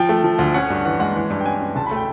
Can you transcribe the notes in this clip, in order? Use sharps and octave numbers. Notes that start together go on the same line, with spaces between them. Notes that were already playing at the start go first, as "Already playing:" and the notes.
Already playing: F3 G5
A3
F3
D2
C#4 F#5
G2
E3 F#5
G#3 F#5
E3
G2
G5
C#4 G#5
C#4
C#2 A5
B5
A3
G5